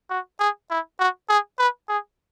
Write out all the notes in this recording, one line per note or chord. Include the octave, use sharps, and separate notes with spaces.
F#4
G#4
E4
F#4
G#4
B4
G#4